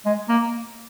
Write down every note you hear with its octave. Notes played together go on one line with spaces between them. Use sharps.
G#3
A#3